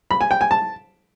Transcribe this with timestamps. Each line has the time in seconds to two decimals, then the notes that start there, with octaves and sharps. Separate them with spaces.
0.11 B5
0.21 G#5
0.31 G5
0.41 G#5
0.51 A5